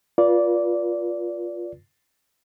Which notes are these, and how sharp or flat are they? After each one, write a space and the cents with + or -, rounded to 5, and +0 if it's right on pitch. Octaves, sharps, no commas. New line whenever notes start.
F4 +0 B4 -35 D5 -15